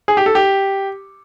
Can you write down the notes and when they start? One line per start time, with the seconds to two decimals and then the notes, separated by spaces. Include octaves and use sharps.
0.08 G#4
0.17 G4
0.26 A4
0.35 G4